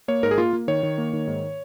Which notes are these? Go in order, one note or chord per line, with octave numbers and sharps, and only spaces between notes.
A#3 C#5
G#2 A#4
G#4
A#3 F4
A#3
D#3 C#5
D#3
A#3
D#3
G#2